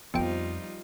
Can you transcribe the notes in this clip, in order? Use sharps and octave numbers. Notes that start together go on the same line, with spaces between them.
F2 F3 G3 B3 C4 D#4 F4 G5